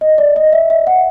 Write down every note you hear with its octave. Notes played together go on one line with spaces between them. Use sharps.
D#5
D5
D#5
E5
E5
F#5